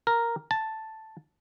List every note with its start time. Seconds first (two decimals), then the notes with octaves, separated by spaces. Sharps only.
0.07 A#4
0.51 A5